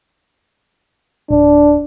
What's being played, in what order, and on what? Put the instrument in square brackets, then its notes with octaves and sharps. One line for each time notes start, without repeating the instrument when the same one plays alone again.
[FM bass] D1 [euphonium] D4